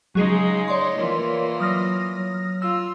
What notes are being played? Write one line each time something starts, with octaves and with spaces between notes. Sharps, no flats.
C#3 F#3 G#3 D#4 G#4 C7
C#5 D5 C6
E3 A#3 F4 A#4
F#3 D#6 F6 A#6
F#3
F4 E6